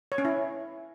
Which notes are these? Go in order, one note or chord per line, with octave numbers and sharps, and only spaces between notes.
C#5
C#4
E4